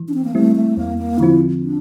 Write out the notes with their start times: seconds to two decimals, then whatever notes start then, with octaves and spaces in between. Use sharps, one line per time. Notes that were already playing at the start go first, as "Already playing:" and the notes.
Already playing: E3
0.08 D4
0.14 C4
0.24 A#3
0.34 G3 A3 C4 E4
0.56 A3
0.77 E2 A#3
0.98 A#3
1.19 D3 F3 C4 E4 F4
1.61 D4